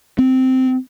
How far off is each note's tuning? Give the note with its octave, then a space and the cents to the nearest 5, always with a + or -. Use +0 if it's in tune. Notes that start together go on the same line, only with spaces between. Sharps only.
C4 -10